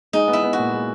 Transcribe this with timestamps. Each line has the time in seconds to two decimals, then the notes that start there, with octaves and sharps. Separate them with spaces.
0.13 G#3 D#4
0.28 B3
0.33 E4
0.43 B3
0.53 F#4
0.58 A#2
0.73 G#3